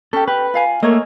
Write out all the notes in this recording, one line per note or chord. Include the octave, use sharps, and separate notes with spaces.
C#4 G4 A4
G4 B4
F4 F5 G#5
A3 A#3 A#4 C#5 D#5